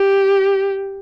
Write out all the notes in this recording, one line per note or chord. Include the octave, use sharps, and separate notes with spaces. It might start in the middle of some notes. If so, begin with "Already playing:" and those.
Already playing: G4